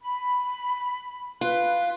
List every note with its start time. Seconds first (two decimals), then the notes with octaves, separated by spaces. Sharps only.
0.01 B5
1.41 F4 B4 F#6